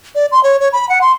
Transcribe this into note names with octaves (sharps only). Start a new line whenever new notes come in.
D5
C6
C#5
C#5
B5
F#5
C6